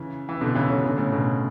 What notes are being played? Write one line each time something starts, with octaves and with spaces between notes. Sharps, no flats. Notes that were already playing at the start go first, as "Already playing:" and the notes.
Already playing: C#3 E3
E3
B2 D3
C#3 E3
D3 F#3
B2 D3
A2 C#3
B2 D3